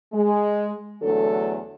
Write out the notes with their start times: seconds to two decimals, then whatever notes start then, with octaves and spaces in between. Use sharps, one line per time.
0.13 G#3
1.03 E2 D3 F#3 A3 D4 A4